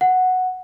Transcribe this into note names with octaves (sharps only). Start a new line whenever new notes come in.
F#5